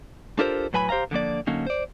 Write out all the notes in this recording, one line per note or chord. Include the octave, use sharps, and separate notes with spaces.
D4 F4 G4 A4 A#4 C5
A2 F#3 B4 G#5 A#5 B5
G4 C5 D#5 F5 A#5
D3 F3 A#3 D5
D3 F#3 A#3 C#4 D#4
C5 D5